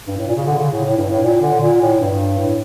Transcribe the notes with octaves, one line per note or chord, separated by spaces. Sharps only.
G2
A2
A#2
C#3
D3
C#3
A2
A2
G2
A2
A#2
D3
A#2
A2
G2
A2